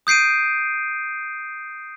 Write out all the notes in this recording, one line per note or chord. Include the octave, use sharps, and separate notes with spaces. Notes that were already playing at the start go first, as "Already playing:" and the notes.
D#6 G6 C7 D7 D#7